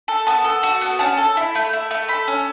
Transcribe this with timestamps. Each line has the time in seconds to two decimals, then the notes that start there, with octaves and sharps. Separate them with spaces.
0.08 A4
0.27 B3 A5
0.45 A4
0.63 F#4
0.81 B3
0.99 C#4 A5
1.17 A4
1.37 E4
1.55 A3
1.73 E4
1.91 A3
2.09 A4 B5
2.28 C#4